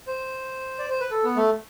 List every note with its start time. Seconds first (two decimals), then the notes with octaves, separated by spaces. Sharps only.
0.07 C5
0.79 D5
0.90 C5
1.00 B4
1.11 A4
1.24 B3
1.37 A3